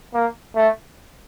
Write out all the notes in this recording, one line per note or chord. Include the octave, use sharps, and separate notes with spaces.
A#3
A3